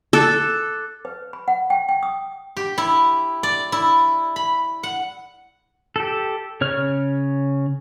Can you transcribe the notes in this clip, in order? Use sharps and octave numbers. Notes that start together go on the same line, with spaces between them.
A4 D6 F#6 A6
B4
B5
F#5
G5
G5
D#6
G4
E4
D5
E4
B5
F#5
G4 A4
C#3 C#5 F6